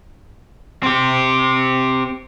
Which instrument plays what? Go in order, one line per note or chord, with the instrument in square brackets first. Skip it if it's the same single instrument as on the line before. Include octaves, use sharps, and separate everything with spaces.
[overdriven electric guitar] C4 G4